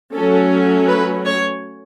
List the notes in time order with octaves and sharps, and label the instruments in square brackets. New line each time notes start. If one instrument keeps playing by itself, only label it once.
[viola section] F#3 A3 C#4 A4
B4
C#5